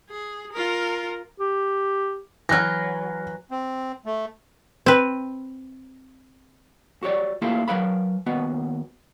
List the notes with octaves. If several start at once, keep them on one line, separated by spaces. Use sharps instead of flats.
G#4
F4 A#4
G4
E3 F#3 F6 F#6 A#6
C4
A3
C4 B4
F#4 G4 C#5 D5
A3 A#3 E4 F4 G4 A4
F#3 A#4 B4 F5 B5
D#2 B3 F#4